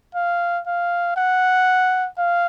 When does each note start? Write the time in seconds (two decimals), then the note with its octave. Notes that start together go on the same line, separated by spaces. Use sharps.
0.15 F5
0.67 F5
1.16 F#5
2.18 F5